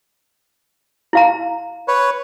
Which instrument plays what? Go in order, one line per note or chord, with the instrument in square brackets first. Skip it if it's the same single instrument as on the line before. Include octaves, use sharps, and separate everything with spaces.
[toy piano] E4 F5 A#5
[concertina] B4 C#5